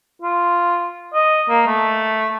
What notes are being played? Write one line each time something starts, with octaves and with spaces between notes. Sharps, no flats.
F4
D#5
A#3
A3